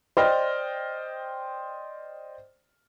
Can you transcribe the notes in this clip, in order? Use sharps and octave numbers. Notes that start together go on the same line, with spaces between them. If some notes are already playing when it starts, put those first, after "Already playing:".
C5 D5 D#5 G5 F6